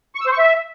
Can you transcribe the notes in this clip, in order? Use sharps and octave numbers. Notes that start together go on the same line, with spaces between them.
C#6
E6
C5
C#6
E5